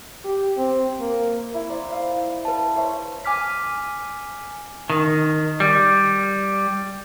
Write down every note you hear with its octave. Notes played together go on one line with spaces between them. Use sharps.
G4
C4
A#3
E4
C5 D5 A#5
E4 F5
B4 A5
C5 C#5 E5
G#5 D6 F6 B6
D#3
G3